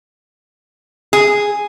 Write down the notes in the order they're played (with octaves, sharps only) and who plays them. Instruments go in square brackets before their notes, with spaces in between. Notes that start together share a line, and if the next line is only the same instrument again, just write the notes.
[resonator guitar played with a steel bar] G#4